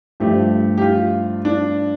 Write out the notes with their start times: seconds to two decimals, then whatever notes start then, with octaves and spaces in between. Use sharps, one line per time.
0.20 G2 F3 A3 G4
0.78 G4
0.81 F4
1.45 D4